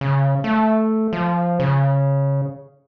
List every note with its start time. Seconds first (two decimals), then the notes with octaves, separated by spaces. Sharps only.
0.01 C#3
0.44 A3
1.13 F3
1.60 C#3